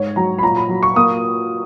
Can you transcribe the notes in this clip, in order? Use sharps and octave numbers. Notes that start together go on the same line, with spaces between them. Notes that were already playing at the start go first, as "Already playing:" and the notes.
Already playing: G#2 C#5
F#3 A#5
B5
A#2 A#5
B5
F#3
C#6
A#3 D#6